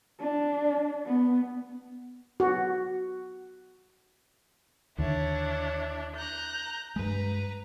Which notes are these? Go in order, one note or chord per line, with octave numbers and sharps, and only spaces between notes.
D4
B3
F#4
D#2 D3 D4 E4 C#5
A#5 F#6 G6
G2 G#3 B4 A#5